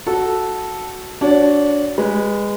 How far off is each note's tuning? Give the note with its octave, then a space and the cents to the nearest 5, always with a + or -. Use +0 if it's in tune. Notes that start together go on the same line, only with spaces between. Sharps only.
F#4 +0 A4 -5
D4 -15 F#4 +0 C#5 +0
G#3 -20 B4 +0